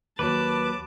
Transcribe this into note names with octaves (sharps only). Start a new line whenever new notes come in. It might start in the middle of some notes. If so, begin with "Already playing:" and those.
D#2 F#3 B4 A5 D6